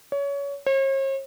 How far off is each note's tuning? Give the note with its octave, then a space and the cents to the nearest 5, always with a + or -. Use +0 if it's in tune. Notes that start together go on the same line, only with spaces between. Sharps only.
C#5 +25
C#5 -45